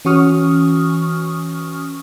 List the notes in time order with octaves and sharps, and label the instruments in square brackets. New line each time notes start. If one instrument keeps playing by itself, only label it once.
[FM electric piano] E3 C#4 F#4 C#6 D#6 F6